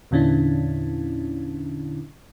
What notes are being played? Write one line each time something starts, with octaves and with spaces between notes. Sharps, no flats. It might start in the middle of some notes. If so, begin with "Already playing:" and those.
E2 A#2 D3 C#4 D4 E4